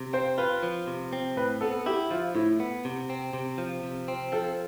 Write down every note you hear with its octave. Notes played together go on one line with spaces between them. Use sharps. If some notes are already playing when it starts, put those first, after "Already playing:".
Already playing: C3
C4 C5
F4 B4
F3
C3
C4
A2 B4
B3 A4
E4 G4
F3 F4
A2 E4
B3
C3
C4
C3
F3
C3
C4
F3 A4